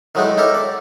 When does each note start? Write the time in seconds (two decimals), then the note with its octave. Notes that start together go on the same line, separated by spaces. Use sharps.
0.15 D#3 F#3 G#3 A3 D#4 E4
0.38 D#4 E4 G4 A4 A#4 C#5
0.54 D5